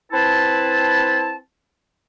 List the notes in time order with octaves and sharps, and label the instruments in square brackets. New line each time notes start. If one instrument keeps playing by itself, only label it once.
[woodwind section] C4 E4 B4 A5